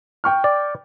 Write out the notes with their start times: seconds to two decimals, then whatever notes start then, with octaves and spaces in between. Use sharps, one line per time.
0.24 G5 C#6 F6
0.44 D5